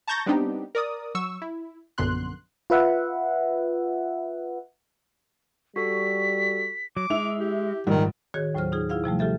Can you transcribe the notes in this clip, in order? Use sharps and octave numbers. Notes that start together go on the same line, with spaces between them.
A5 A#5 C#6 G6 A6 A#6
G3 B3 C4 D4 D#4 G4
A#4 D5 D#6
F#3 C#6 E6
E4
A#1 F#2 D3 B3 C6 F#6
F4 B4 E5 F#5
G3 F#4 A4 B6
F#3 D6
G#3 E4 E5 F7
G4
A#1 G#2 D#3 G3
A2 D#3 F#4 G#4 C#5 G#6
D#2 A2 F#3 F4 C5 F6
D#4 F4 G#4
E4 F4 G#4 F5 F#5
C3 F3 G3 A3
F4 G4 A4 E5